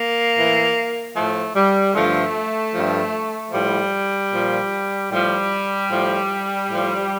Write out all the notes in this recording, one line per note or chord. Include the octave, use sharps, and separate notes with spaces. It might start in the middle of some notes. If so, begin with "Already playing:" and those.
Already playing: A#3
A2 E3
A2 F3 A3
G3
G2 D3 F3 A3
G2 F3
A2 F3 G3
A#2 F3
A2 F3 G3
A2 F3
A2 F3